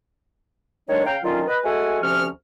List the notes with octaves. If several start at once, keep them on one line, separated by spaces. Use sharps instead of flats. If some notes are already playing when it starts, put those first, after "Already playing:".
D3 D#3 F#3 G#3 D4 C#5
C#3 F5 G5 A#5
D3 D#3 F#3 C#4 F4
B4 D#5
G#3 A3 F#4 A4 F#5 G#5
D2 C3 F3 C#4 C#6 F6